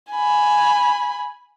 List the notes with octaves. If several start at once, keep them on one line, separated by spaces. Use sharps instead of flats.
G#5 B5